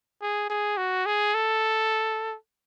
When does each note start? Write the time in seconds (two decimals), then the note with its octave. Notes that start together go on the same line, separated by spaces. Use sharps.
0.22 G#4
0.50 G#4
0.77 F#4
1.06 G#4
1.35 A4